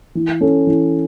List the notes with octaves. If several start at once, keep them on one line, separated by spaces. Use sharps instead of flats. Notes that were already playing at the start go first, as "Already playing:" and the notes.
E3
C#4 A4
E3